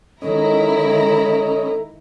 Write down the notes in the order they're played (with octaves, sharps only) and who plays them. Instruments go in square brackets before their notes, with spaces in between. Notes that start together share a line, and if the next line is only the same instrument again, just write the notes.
[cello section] D#3 G#3 [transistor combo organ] C#4 D#5 [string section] E4 A#5 [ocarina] A4